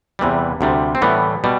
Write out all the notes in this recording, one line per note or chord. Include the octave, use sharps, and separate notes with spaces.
E2 C3 E3 G3
D2 C3 G3
C4
A2 E3 G3 B3
B2 G3